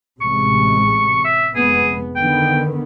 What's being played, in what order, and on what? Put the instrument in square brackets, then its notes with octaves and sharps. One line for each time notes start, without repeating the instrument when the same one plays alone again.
[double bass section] A1 C3 G#3 [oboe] C#6
[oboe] E5
[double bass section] F1 G#3 B3 [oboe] G#4
[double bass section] D3 D#3 B3 [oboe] G5